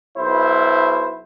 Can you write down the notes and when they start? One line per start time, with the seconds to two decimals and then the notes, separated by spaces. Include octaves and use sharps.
0.18 B1 E4 C5